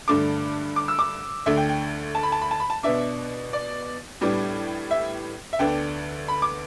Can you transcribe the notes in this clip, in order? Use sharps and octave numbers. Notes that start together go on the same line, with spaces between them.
G2 D3 A3 D4 D6
D6
E6
D6
D2 D3 A3 D4 E5
G5
G5
A5
B5
A5
B5
A5
B5
A5
B2 B3 D4 E5
D5
A2 G3 B3 D4
E5
E5
D2 D3 B3 D4 G5
B5
D6